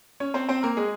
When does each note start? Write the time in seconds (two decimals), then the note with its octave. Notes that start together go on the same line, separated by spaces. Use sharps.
0.20 C#4 C#5
0.34 C4 C5
0.49 C4 C5
0.63 A#3 A#4
0.77 G#3 G#4